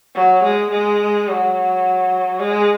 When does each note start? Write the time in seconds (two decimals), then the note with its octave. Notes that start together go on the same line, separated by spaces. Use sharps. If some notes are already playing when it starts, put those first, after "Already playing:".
0.15 F#3
0.44 G#3
0.71 G#3
1.28 F#3
2.40 G#3